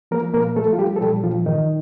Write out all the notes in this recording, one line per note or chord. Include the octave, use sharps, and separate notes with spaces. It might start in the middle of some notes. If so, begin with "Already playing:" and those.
F3 A#3 A#4
A#2 A#3 A#4
F3 A3 A4
F4
F3 G3 G4
A4
A#2 G3 G4
A#2 F3 F4
G2 D#3 D#4